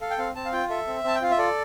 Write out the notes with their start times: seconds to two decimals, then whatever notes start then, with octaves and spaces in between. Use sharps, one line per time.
0.01 A4 F5
0.10 G5
0.18 C4 F5
0.35 C4 A5
0.45 F5
0.53 F4 G5
0.70 A4 E5
0.87 C4
1.04 C4 A5
1.15 G5
1.21 F4 F5
1.30 E5
1.38 A4 D5